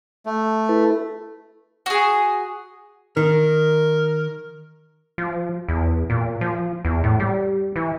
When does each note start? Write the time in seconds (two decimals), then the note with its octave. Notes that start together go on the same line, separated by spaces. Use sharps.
0.26 A3
0.69 E4 A4 B4
1.86 F#4 G#4
3.17 D#3 A#4
5.18 F3
5.68 E2
6.10 A#2
6.41 F3
6.85 E2
7.04 A2
7.20 G3
7.76 E3